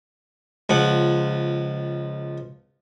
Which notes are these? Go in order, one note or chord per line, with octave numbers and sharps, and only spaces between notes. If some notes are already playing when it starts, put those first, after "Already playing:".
C#2 F3 F#5